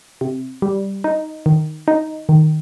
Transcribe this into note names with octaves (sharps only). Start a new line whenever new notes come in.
C3
G3
D#4
D#3
D#4
D#3